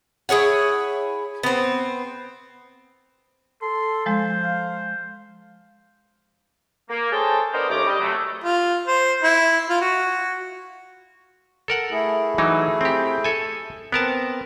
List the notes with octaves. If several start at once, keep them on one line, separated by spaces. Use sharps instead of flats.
E4 G#4 C#5 F#5
B3 C4
A4 C6
F3 G#3 C5
F5
A#3
G#4 A4 C5 C#5 G5 A5
B3 D4 A#4 C5 D5 D#5
D#2 A3 C#4 C5 A#5 D6
G3 D#5
C3 F#3 A3
F4
C5
E4
F4
F#4
A4 A#4 F#5
A3 E4 G#4
E3 F#3 D#4
C4 G4
A4 G#5
B3 C4 A#4 A5